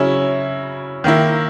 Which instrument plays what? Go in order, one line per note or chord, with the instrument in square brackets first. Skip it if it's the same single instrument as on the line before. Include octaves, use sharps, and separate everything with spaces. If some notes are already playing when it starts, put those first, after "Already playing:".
Already playing: [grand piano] C#3 F#3 C#4 E4
D#3 A#3 E4